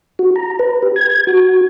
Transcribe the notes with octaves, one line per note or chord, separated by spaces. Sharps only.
F#4
A#5
B4
G4
G#6
G#6
F#4